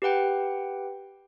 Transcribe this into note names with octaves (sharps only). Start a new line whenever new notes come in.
G4 B4 F#5 G5